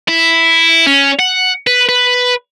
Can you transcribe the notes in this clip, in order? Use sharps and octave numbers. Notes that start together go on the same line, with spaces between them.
E4
C#4
F#5
B4
B4